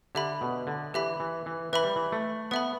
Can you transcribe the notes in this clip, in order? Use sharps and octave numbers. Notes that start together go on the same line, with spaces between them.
D3 G4 E5 B5
B2
D3
E3 G4 E5 B5
E3
E3
E3 B4 E5 B5
G3
E3
A3
B3 B4 E5 B5